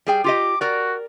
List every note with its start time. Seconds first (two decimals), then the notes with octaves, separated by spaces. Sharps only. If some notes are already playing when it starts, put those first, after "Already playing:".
0.07 G3 G#4 G5
0.24 F4 G4 D#5 D6
0.61 F#4 A#4 D5